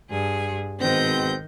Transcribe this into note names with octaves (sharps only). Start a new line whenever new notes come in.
G2 G#4
G#2 B2 D#3 C4 G6 A#6